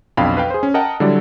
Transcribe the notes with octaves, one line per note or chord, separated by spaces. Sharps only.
B1 F2 D4 F5 G5 B5
B4 F5 G5
G#4 C5
C#4
A#4 D#5 F#5 G5 A5
D3 F#3 G3 E4 D5